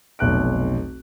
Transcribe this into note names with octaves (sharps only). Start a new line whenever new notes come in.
F1 B1 F#6 D7